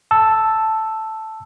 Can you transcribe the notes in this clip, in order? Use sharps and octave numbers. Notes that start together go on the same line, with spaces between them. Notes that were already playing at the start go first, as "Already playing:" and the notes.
A5 E6